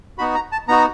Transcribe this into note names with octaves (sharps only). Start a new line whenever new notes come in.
B3 D#4 F#4 B5
A#5
A5
B3 D#4 F#4 A#5